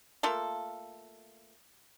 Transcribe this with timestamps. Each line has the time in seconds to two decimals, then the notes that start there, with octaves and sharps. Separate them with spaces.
0.23 A3 A#3 F4 A4